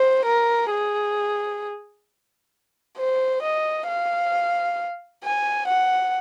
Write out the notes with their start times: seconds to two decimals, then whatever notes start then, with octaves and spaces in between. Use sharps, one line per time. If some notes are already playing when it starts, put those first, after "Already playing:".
Already playing: C5
0.26 A#4
0.71 G#4
2.98 C5
3.42 D#5
3.88 F5
5.24 G#5
5.68 F#5